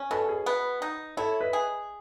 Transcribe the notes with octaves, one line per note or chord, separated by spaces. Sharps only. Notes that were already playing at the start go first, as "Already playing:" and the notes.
Already playing: C#4
B2 A4
G#4
B3
D#4
E4 A4 C#5
B4 D#5
G#4